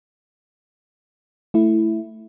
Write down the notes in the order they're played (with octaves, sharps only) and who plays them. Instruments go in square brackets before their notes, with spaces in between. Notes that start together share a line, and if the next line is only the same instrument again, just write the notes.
[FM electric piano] A3 E4